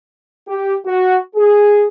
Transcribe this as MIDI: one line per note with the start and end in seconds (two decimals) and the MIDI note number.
0.47 0.74 67
0.85 1.17 66
1.36 1.85 68